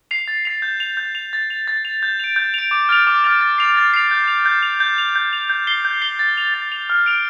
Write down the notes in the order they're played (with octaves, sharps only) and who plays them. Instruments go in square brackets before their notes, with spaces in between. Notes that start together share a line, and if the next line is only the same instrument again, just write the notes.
[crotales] C7 F7
A6
C7 F7
G6
F7
G6
F7
A6
F7
A6
F7
G6
D7 F7
G6
D7 F7
D6
F6 A6 F7
D6
F6 A6 F7
A6
C7 F7
A6
C7 F7
G6
F7
G6
F7
G6
F7
G6
F7
G6
C7 G7
G6
C7 G7
A6
F7
A6
F7
F6
D7 F7